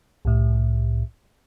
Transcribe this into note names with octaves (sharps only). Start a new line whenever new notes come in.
C2 A2